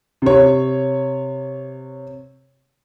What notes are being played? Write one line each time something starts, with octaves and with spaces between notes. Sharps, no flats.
C3 C#5